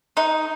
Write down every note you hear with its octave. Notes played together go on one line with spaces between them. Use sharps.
D#4